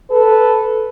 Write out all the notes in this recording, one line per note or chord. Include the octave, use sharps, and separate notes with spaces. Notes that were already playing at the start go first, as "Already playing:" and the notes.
A4 B4